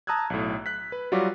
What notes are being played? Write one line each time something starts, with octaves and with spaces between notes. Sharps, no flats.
A5 A#5 D#6 E6 F#6 G#6
B1 A2
F#6 B6
B4
F#3 G3 F4 F#4 D6